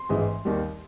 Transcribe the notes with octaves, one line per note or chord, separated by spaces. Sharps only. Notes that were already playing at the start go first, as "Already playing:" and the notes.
Already playing: C6
A1 G#2 E3 G#3
D#2 D#3 G3